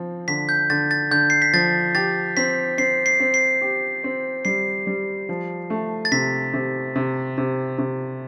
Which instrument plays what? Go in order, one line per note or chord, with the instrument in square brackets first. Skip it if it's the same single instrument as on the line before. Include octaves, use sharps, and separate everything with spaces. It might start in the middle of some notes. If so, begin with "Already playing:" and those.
Already playing: [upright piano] F3 C4
[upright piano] D3 [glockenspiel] B6
[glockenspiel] G6
[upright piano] D3 [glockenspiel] A6
[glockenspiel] A6
[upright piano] D3 [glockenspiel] G6
[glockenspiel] C7
B6
[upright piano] F3 [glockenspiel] A6
[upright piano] G4 [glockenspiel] A6
[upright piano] C4 [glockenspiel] B6
[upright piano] C4 [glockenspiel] C7
[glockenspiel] C7
[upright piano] C4
[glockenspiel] C7
[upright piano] G4
C4
[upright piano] G3 [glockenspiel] C7
[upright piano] G3
F3
A3
[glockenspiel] A6
[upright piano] C3 [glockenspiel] B6
[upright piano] C3
C3
C3
C3